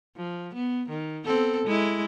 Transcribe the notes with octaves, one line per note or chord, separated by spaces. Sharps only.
F3
B3
D#3
B3 C4 A4
G#3 E4